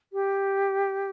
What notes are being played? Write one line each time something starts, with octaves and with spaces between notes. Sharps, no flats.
G4